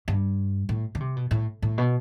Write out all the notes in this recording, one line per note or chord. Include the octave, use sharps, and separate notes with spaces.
G2
A2
D3
C3
B2
A2
A2
B2